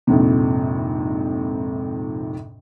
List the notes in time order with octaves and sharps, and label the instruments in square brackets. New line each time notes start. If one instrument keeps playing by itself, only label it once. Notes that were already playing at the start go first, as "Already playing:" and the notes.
[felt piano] A#1 F2 G#2 C3